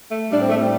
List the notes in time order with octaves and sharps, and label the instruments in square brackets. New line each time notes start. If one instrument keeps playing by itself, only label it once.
[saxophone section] A3
A2 G3 D4
C4
A3
G3 C4